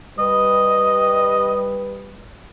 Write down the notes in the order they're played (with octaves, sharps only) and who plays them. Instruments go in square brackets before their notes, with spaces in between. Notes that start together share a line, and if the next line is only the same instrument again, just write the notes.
[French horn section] G3 B4 [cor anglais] D#5